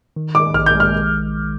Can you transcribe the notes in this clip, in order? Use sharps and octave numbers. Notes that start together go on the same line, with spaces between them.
D#3
D#3 D6
A#1 F6
G6
G#3
F6